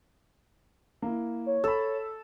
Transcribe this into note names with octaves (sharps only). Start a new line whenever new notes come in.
A#3 E4
C#5
A4 B5 E6